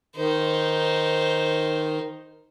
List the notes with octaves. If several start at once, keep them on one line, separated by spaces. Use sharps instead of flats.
D#3 D#4 C5